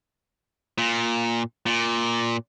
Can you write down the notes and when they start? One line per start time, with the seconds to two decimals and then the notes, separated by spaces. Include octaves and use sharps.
0.78 A#2
1.66 A#2